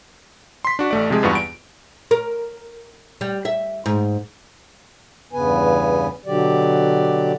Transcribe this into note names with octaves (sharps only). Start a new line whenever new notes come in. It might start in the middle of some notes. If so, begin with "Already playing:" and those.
C6 B6
D4 F#4
A1 A3 D5
C3 F3 G#3 G#4
E2 G2 B3 F4 C#6
D7
A#4
G3
E5
G#2
E2 G2 C#3 B3 B4 G#5
B2 D3 F#3 G4 D5